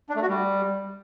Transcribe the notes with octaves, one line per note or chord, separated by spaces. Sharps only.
D4
A3
F#4
G3